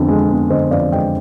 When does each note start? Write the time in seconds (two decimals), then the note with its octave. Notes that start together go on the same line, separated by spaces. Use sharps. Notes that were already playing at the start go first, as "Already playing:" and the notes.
Already playing: F2 D3 B3
0.08 G#3
0.29 B3
0.50 D3 C5 D#5
0.70 F2 D5 F5
0.91 G#3 D#5 G5